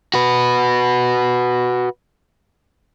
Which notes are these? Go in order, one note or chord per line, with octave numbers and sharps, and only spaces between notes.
F#4 B4